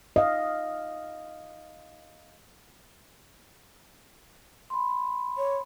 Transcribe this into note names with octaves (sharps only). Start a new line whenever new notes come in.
D#5 F5
B5 C6
C#5